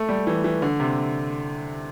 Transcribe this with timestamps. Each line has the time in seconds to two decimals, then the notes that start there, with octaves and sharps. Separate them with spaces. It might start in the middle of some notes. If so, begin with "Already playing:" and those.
Already playing: A3
0.09 G3
0.27 E3
0.44 E3
0.62 D3
0.80 C3